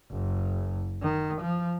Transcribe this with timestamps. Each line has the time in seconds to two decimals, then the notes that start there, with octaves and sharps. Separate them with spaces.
0.11 F#1
1.02 D#3
1.41 F3